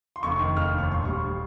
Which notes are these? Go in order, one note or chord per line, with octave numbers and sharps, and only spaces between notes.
C6
F1 C#6
D#3
F1 F6
D#2
C#6
A#1 C6
G3 C#6